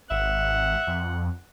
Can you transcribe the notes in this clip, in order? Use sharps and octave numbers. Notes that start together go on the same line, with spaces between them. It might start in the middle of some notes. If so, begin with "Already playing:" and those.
G#1 E5 F#5
F2